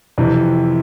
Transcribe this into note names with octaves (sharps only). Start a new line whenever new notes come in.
F2 C3 E3